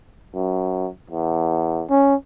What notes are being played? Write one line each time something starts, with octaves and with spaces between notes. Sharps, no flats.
F#2
E2
C#4